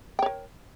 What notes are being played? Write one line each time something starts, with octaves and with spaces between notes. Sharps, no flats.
A#4 C#5 G5